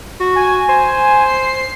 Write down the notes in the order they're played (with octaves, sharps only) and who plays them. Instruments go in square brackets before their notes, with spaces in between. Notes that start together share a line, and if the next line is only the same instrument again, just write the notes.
[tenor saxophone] F#4
[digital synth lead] G#5
[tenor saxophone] C5
[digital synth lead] C7